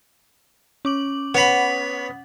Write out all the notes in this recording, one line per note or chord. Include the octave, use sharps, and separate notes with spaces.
C#4 D6 F#7
B3 C#5 B5